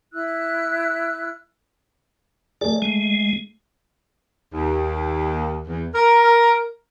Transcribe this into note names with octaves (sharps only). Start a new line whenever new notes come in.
E4 E6 F#6
A3 G#4 D5
G#3
D#2
E2
A#4